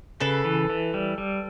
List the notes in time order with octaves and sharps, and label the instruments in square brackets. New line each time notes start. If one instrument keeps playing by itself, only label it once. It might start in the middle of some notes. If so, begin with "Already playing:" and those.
[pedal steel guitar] C#3 [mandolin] A4 B4
[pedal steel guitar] E3
E3
G3
G3